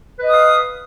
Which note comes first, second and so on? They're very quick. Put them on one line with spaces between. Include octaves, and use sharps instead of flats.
B4 D#5 D#6 F5